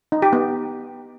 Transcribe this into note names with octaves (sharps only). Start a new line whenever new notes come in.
D#4
G4
B3